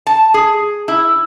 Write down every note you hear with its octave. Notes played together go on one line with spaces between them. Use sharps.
A5
G#4
E4